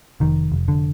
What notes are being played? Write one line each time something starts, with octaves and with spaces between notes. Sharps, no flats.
F1 D#3
F1
D3